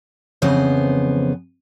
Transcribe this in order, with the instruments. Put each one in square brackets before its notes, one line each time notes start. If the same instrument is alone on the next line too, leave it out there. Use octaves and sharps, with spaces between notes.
[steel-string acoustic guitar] F2 C#3 E3 B3 C5